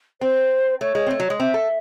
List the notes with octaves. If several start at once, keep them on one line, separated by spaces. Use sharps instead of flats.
C4 C5
A3 C#5
G#3
C4
A3
F#3
G#3
C4 E5
A4